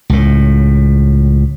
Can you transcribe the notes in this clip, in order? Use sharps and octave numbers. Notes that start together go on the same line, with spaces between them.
C#2 A2